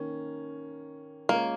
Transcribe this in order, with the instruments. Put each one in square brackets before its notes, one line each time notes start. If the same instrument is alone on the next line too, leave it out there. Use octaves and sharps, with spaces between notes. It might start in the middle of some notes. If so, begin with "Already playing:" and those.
Already playing: [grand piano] D#3 A#3 C#4
[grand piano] G#3 C#4 F4 A#4 C#5 [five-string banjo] A#3